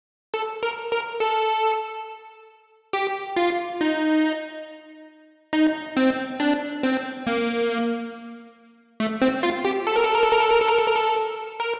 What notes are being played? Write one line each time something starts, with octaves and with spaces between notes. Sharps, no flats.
A4
A#4
A#4
A4
G4
F4
D#4
D#4
C4
D4
C4
A#3
A3
C4
F4
G4
A4
A#4
A4
A#4
A4
A#4
A4
A#4
A4
A#4
A4
A#4
A4
A#4